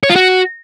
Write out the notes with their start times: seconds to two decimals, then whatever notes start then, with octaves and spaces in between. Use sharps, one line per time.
0.04 C#5
0.10 F4
0.16 F#4